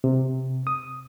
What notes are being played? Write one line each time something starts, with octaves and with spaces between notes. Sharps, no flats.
C3
D#6